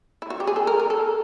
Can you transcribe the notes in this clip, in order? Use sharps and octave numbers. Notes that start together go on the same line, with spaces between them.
E4
F#4
G4
G#4
A4
A#4
A#4
A4